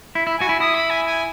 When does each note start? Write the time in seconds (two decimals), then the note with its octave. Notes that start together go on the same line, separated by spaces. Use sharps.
0.15 E4
0.27 E4
0.38 F#4 G#5
0.49 E4
0.60 E4 D#6
0.74 B5
0.90 G#5
1.05 G#5